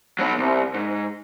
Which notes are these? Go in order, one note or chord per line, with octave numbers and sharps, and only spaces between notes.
F#3 B3
C2
G#2